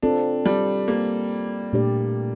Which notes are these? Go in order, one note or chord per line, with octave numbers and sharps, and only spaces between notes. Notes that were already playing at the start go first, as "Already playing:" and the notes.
C4 D4 F4 A4
G3
A#3
A#2 A3 D4 G4 D5